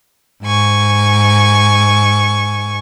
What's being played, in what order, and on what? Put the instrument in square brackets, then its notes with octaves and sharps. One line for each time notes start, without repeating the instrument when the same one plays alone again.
[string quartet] G#2 G#5 C#6